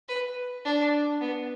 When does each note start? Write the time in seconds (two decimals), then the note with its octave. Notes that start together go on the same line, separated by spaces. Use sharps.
0.09 B4
0.65 D4
1.21 B3